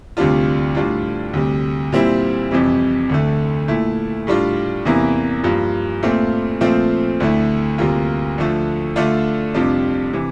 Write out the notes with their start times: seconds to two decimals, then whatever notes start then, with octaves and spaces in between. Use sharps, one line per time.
0.17 D2 C3 G3 D4 F4
0.75 A2 G3 D4 F4
1.33 D2 C3 G3
1.92 A#2 G3 C4 E4
2.51 F2 C3 E3 G3
3.09 D2 D3 A3
3.68 A#2 A3 E4
4.27 A2 G3 D4 F4
4.85 E2 C3 E3 A#3 E4
5.43 G2 F3 A#3 F4
6.03 A#2 A3 C4 F4
6.61 A#2 F3 A3 C4 F4
7.20 D2 D3 A3 E4
7.78 D2 C3 G3 A#3 F4
8.37 D2 D3 F3 A3
8.96 D3 A3 D4 F4
9.54 F2 C3 G3 D4 F4
10.13 C3 E3